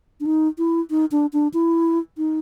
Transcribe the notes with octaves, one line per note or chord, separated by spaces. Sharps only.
D4
D#4
E4
D#4
D4
D4
E4
D#4